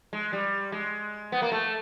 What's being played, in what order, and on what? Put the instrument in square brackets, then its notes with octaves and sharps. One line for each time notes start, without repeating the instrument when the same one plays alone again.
[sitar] G#3
G3
G#3
B3
A#3
A3